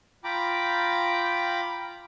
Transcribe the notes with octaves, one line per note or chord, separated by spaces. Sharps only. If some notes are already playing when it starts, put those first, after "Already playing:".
F4 G5 A#5 B5 D6